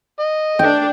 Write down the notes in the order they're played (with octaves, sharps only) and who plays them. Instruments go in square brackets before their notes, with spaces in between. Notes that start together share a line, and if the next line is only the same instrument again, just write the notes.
[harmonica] D#5
[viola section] D4 A4 [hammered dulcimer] G5